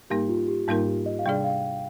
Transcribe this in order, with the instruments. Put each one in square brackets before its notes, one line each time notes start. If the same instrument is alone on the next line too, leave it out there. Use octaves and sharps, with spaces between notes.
[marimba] G#2 G3 A#3 D#4 A#4 [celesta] G4
[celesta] F4
G4
[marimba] G#2 G3 A#3 D#4 A#4 [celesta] F4
[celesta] G4
D#5
F5
[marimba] C3 G3 D4 G#4 D5 [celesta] G5
[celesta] F5